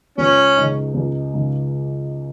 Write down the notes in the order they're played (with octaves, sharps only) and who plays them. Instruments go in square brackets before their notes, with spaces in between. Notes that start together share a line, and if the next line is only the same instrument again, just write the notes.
[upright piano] C#2 [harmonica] C#4
[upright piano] C#3 G#3 D#4
C#2
C#3 G#3 D#4